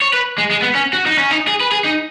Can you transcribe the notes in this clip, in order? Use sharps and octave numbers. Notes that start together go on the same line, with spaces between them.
C#5
B4
G#3
G#3
B3
C#4
F#4
D#4
C#4
D#4
G#4
B4
G#4
D#4